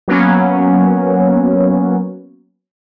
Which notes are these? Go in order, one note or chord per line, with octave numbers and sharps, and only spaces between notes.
F#3 A#3 B3 C#4